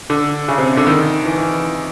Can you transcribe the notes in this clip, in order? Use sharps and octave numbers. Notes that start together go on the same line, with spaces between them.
D3
C#3
C3
D3
D#3
E3
E3